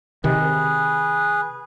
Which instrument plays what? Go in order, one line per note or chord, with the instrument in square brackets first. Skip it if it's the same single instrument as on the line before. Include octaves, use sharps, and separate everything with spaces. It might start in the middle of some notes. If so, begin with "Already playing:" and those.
[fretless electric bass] C3 D#3 [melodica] G#4 B4